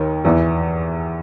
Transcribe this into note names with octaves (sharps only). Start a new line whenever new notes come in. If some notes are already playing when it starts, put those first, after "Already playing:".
Already playing: D#2 D#3
E2 E3